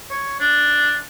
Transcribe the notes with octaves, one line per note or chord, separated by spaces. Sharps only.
C#5
D4